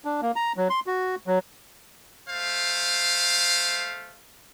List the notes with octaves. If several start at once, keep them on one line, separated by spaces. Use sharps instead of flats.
D4
A#3
A#5
F#3
C6
F#4
F#3
A3 C5 F5